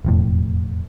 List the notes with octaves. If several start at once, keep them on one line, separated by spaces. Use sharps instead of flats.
E1 F2 A2